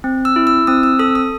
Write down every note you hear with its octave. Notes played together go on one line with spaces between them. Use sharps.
C4
E6
E4
E6
C4 D#6
E6
A4 D#6
D#6